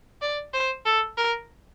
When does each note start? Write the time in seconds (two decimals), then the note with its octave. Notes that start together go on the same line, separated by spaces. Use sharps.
0.22 D5
0.54 C5
0.85 A4
1.18 A#4